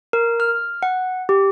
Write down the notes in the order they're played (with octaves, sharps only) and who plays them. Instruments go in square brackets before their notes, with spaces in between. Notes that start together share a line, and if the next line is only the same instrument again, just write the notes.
[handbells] A#4
F6
F#5
G4